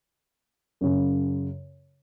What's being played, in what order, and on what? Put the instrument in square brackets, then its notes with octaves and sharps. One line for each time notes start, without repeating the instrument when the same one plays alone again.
[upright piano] F#2 C#3